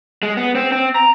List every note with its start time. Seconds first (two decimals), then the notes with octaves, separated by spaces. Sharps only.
0.23 G#3
0.37 B3
0.55 C4
0.72 C4
0.96 A#5